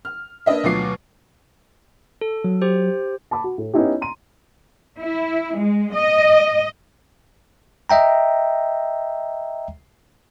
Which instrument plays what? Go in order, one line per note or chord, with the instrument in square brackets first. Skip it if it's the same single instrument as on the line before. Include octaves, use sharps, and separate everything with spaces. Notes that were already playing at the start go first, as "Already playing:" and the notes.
[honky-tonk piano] F6
A#3 D4 B4 D#5 E5
D2 B2 F#3 F4 D6 C7
[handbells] A4
[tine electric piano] F#3
[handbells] G4 C5
[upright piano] A5 B5 D6
F#4
A2
B3 C#4 D#4 E4 G4
A#5 C6 D#7
[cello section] E4
G#3
D#5
[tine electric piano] D#5 E5 G5 A#5